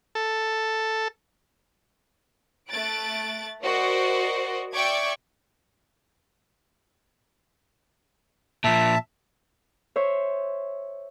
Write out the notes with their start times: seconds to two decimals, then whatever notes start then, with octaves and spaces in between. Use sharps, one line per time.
0.15 A4
2.69 A3 F#6 A6 D7
3.61 F#4 A#4 C5 D5 D#5
4.75 D5 E5 G5 C#6 D6 G#6
8.64 A#2 F3 E5 A5
9.96 C5 C#5 E5